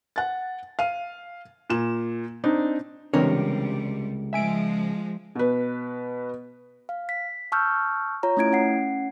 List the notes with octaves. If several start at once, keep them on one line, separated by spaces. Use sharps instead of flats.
F#5 A6
F5 D#7
A#2 E7
C4 D4 D#4
C#2 C3 E3 G3 C4 D4 A#4 C#5
F3 G#3 E5 G#5 D7
B2 B4
F5
B6
A5 C#6 E6 F6 G6
F4 C#5 A#5
A3 C#4 E4 G#6 D7
C#4 F#5 C7